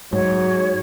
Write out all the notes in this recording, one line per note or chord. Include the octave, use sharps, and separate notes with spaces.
G#2 F#3 C#5